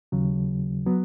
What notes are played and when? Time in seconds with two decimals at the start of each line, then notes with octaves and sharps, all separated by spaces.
0.12 D#2 C#3 F#3
0.86 F#3 B3